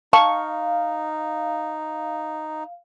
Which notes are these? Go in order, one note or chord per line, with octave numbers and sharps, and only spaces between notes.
D#4 F5 A5 C#6